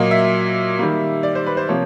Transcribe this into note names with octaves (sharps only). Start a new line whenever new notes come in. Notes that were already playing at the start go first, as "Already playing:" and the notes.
Already playing: A#2 F#3 A#3 D#5
E5
D#3 G3 A#3
D5
C5
B4
C5
C3 F3 A#3 C#5